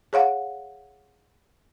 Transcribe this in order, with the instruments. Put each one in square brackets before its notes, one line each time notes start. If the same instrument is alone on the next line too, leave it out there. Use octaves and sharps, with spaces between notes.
[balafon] G#4 C#5 F5 F#5